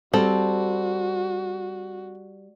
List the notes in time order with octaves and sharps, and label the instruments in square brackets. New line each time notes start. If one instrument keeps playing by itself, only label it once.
[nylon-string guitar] G3 [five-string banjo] C4 A4 [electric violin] F#4